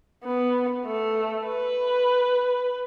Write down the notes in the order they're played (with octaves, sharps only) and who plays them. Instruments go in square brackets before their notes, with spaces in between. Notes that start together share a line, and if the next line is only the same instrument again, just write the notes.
[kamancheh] B3
A3
B4